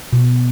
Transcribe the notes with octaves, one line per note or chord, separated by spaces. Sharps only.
B2